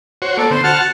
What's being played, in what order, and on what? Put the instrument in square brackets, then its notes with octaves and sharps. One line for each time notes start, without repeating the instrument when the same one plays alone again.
[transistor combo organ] F#4 C5 C#5
[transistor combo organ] A#3 D5 [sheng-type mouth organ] A4
[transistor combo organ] D3 B3 [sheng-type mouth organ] C5 C6
[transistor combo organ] F#4 [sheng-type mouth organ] F#5 A5 F6